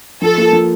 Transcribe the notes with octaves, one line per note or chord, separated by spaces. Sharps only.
F3 A4
A#3 F4 A#4
F3